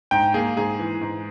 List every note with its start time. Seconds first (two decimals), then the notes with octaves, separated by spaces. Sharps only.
0.11 G#2 G5
0.34 A#3 G#4
0.57 G#2 G#4
0.79 E3
1.01 G#2